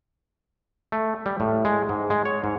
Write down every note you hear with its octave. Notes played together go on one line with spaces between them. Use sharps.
A3
G3
A2
G#3
G#2
G#3
C#5
G#2